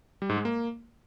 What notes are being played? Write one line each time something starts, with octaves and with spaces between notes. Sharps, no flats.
G3
G#2
G#3
A#3